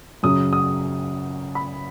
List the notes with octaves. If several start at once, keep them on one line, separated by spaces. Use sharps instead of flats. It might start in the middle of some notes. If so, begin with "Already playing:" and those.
F#2 C#3 F#3 D#6
D#6
B5